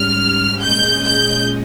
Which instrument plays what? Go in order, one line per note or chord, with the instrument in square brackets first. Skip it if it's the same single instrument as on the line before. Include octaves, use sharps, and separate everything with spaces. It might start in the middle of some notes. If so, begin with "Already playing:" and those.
Already playing: [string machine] G#2 G3 C#4 [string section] F6
[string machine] A#2 G#3 C#4 G#4 D#5 [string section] G6
[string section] G6